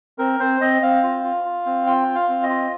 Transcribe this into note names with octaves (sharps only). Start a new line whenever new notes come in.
C4 A#4
C4 C5
C4 D#5
C4 F5
F4
F4
F4
C4
F4 G5
F4
F5
C4
D#5
F4